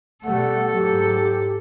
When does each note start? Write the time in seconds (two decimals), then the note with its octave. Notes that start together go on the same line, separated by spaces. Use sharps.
0.24 B2 G3 A3 A4 F#5
0.73 G#2 F#3 G4